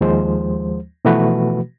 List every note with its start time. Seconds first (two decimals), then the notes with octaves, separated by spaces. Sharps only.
0.01 D#2 F3 G#3 C5
1.05 B2 E3 F3 A3 F#4 B4